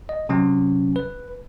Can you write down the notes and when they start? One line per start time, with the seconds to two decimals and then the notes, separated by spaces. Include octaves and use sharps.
0.09 D#5
0.29 C3 F#3 C#4
0.96 B4